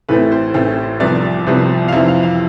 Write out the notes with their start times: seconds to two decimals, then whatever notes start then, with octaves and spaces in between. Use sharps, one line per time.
0.09 A1 A2 E3 A3 C4 B4
0.32 C5
0.54 A1 A2 E3 A3 C4
1.00 C2 C3 F3 B3 D5
1.47 C2 C3 F3 B3
1.88 F5
1.93 F2 C3 E3 E5
2.08 F5
2.23 F5